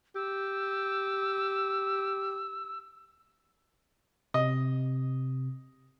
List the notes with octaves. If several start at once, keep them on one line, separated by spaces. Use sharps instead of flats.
G4 E6
C3 D#5